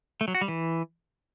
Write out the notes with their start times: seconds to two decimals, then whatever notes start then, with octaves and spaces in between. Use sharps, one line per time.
0.21 A3
0.28 F#3
0.35 F#4
0.41 G3
0.48 E3